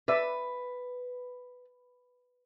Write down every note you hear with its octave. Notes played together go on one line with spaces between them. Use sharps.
B4 D5 E5